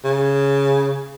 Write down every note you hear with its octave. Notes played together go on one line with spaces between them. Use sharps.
C#3